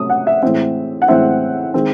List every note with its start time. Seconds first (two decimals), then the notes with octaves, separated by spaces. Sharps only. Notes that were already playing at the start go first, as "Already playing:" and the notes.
Already playing: C3 F#3 A3 C#4 D#6
0.10 F#5
0.27 E5
0.43 A2 E3 G#3 C4 E5
1.02 F#5
1.08 A2 E3 G#3 C4 E5
1.74 D#3 G#3 C4